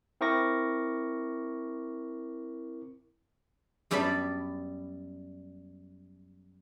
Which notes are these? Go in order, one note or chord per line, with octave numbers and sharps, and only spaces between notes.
C4 E4 A#4 C#6 D6 A#6
F#2 G3 B3 D5 A5 B5